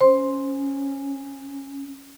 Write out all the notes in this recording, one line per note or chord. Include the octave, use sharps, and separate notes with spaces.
C#4 C5 C6